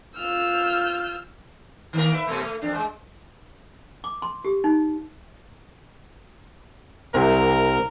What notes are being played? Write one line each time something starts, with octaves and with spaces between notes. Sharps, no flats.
F4 E6 F6 G6
D#3 A#3 A#4
B4 E5
B2 A3
A3
F2 D4
G#3
D6
C6
G4
D#4
C2 C3 A#4